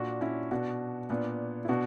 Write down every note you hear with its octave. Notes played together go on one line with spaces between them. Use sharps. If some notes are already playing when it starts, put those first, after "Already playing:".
Already playing: A#2 D4 F#4
C#4 E4
B2 D4 F#4
A#2 B3 D4
E4
B2 D4 F#4